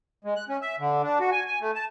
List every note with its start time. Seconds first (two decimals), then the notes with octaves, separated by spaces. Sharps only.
0.24 G#3
0.36 F#6
0.49 C#4
0.62 E5
0.79 D3
1.03 D4
1.20 F#4
1.31 G#5
1.47 G#5
1.61 A3
1.75 A5